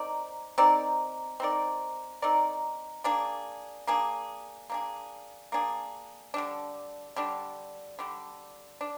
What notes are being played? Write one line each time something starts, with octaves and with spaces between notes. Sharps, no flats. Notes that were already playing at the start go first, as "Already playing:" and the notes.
Already playing: C4 D#4 A#4 D5
C4 D#4 A#4 D5
C4 D#4 A#4 D5
C4 D#4 A#4 D5
A#3 D4 G#4
A#3 D4 G#4
A#3 D4 G#4
A#3 D4 G#4
D3 G3 D4
D3 G3 D4
D3 G3 D4
D4